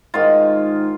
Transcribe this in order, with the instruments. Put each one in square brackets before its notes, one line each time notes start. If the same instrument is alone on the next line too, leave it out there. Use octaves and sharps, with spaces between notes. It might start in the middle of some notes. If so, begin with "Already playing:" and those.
[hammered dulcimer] G#2 D#3 F4